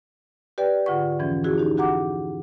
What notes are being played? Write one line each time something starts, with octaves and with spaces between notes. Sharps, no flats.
G4 B4 D5 G5
G#2 D3 F4 F#5 C#6
F2 G#2 E3 F3 C#4
E4 F#4 G#4
D#4 G4
F#4 G4 F#5 A#5 D6